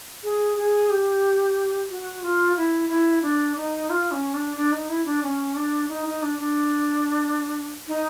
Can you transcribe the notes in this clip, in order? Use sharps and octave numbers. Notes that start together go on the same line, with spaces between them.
G#4
G#4
G4
F#4
F4
E4
E4
D4
D#4
F4
C#4
D4
D4
D#4
E4
D4
C#4
D4
D#4
D#4
D4
D4
D#4